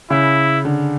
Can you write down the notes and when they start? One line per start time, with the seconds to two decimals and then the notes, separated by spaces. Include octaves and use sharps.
0.10 C#3 E4
0.65 D3